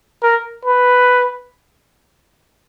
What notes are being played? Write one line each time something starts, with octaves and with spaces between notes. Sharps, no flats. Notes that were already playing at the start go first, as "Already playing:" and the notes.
A#4
B4